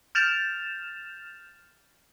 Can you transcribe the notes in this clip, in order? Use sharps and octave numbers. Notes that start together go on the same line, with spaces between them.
F6 G6 A6 E7 F7